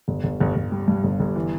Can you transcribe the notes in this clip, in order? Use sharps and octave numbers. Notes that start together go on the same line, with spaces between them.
G1
G1
G1
G1
G3
G2
G1
G1
E3